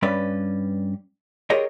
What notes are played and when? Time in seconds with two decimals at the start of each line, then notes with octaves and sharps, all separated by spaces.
0.03 G2 C#4 B4 D5 B5
1.50 F4 G4 G#4 A#4 C#5 D#5